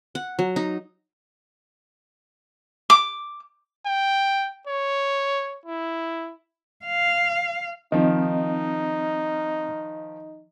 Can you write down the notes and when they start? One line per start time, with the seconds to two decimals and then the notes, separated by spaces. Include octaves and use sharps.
0.15 F#5
0.39 F#3
0.56 D#4
2.90 D6
3.86 G5
4.67 C#5
5.66 E4
6.85 F5
7.92 D#3 F3 C4 D#4 D#5